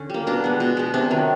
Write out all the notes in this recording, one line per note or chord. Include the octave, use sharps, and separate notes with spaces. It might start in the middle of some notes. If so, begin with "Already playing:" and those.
Already playing: D3 C#4
G3 A#3
B2 D4
G#3 B3
B2
G#3 B3
C3 D4
D#3 F#3